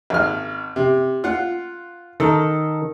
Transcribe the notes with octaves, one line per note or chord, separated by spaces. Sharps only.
G#1 F6
C3
F4 F#5
D#3 A4